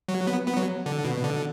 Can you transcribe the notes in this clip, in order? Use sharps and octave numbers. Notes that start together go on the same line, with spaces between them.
F#3
B3
B3
F#3
D3
B2
D3